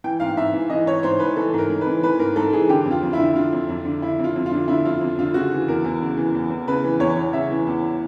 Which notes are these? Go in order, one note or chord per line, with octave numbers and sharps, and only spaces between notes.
E3 G5
G#2 F5
G#2 E5
E3
E3 D#5
G#2 C#5
G#2 C5
E3 B4
E3 A4
G#2 A#4
G#2
B4
E3
E3 B4
G#2 A#4
G#2 A4
E3 G#4
D3 G4
F2
F4
F2
E4
D3
D3 F4
F2
F2
D3
D3 E4
F2
F4
F2
F4
D3
D3 E4
F2 F4
F2
D3 F4
C#3 F#4
E3
E2 A#4
E2
C#3
E3
E2
E2
C#3 B4
E3
E2 C#5
E2
C#3 E5
E3
E2